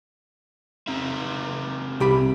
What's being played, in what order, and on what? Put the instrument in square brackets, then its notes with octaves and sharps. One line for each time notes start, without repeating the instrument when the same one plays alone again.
[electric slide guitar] C4 D#4 E5
[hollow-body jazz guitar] C2 G4 B5